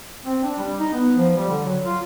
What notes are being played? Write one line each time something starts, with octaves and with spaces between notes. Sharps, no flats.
C4
D4
G3
D#4
B3
F3
G3
D3
F#3
F4